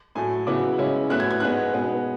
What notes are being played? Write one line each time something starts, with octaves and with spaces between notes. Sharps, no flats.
A2 F#3 A3 G#5
C#3 F#3 B3 E4 D6
C#3 G#3 C#4 E4
A2 F#3 B3 E4 F#6
G#6
G#6
G#2 G#3 B3 F#6
B2 G#3 B3